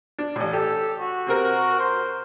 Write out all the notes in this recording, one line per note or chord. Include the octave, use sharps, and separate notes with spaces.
D4
A1 A2
G4 A4
F#4
C3 C4 A#4
C5